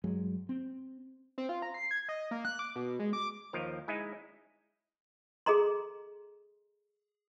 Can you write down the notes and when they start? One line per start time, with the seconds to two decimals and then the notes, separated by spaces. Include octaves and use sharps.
0.04 G2 F#3 G#3
0.49 C4
1.38 C4
1.49 F4
1.62 A#5
1.74 C7
1.91 G#6
2.09 D#5
2.31 A#3
2.45 F#6
2.59 D6
2.76 B2
3.00 G#3
3.13 D6
3.53 D#2 F3 A#4
3.88 G#3 D#4 E4 G#5
5.46 G#4 A4 D#5 A#5 C6